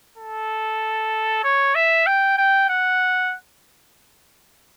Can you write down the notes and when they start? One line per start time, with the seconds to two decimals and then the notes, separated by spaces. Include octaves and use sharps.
0.18 A4
1.44 C#5
1.75 E5
2.06 G5
2.38 G5
2.69 F#5